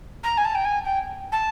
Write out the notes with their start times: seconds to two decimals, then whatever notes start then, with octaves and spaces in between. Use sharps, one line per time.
0.23 A#5
0.37 G#5
0.44 A5
0.55 G5
0.64 G#5
0.84 G5
1.32 A5